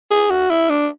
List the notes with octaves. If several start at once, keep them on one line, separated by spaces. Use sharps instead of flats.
G#4
F#4
E4
D4